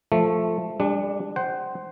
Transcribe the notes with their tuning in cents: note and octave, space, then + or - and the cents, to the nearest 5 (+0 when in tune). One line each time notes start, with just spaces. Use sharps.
F3 +0 A3 +0
G3 +45 D4 +0
C5 +0 F#5 +35